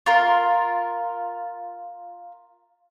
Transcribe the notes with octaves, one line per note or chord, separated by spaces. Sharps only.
F4 A#4